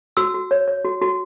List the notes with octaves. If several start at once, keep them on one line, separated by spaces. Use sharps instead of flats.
F#4 E6
F#4
C#5
C#5
F#4
F#4